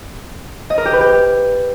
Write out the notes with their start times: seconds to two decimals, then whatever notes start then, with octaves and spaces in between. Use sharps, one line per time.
0.70 D#5
0.78 A#4
0.85 G4
0.93 B4
1.01 G4